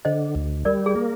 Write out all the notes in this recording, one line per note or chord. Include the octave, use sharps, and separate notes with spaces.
D3 C5 D#5
D2
G3 A#4 D5
G#4
A#3